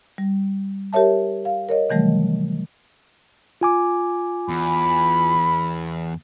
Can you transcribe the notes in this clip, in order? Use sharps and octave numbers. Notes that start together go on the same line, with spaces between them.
G3
G4 A#4 C#5 E5 A5
F5
A#4 C#5 D#5
C3 D#3 E3 F#3 G3 A3
F4 G#5 D6
E2 B5